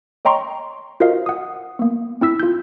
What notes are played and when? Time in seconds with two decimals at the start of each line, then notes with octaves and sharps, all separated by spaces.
0.25 C#5 D#5 G5 A#5 C6 C#6
1.00 F4 F#4 A#4 C5 D#5 F5
1.26 F#5 D#6
1.79 A#3 B3
2.21 C4 E4 E6 B6
2.40 F4 G6